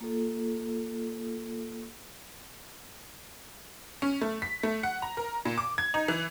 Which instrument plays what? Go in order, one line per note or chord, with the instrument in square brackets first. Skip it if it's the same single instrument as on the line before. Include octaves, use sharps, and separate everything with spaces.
[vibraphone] A#3 F4 A4
[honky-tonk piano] C#4
A3
B6
A3
F#5
A#5
A#4
A#2
D6
G#6
D#4
E3